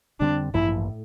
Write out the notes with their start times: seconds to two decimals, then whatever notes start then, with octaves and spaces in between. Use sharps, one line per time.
0.20 F2 D3 G3 C4 D4
0.53 A1 G2 F3 A#3 E4
0.89 A2